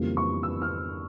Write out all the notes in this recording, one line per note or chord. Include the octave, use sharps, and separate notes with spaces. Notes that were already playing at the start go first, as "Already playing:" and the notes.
Already playing: F2 C#3 E3 G3 A#3
C#6
E6
F6